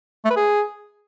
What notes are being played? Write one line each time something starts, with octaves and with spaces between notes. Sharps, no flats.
A3
B4
G#4